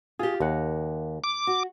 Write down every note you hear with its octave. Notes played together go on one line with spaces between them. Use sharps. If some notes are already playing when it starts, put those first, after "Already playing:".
F4 G4 G#4
D#2 A#3 F#5
D6
F#4